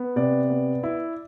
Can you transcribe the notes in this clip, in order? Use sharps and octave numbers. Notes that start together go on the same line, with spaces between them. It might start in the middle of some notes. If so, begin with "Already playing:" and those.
Already playing: B3
C3 D5
B3
E4